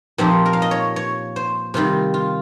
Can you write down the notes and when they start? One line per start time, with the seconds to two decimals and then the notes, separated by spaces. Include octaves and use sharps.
0.18 A#2 F3 C4 D#4 G4
0.46 A#4
0.53 F5
0.62 D#5
0.71 C#5
0.96 C#5
1.36 C5
1.74 C3 D#3 G3 F4
2.14 F4